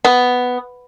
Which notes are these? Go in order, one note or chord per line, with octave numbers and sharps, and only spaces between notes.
B3